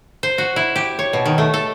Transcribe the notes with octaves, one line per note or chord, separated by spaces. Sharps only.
C5
F#4
E4
G4
C#5
B2
D#3
A3
A4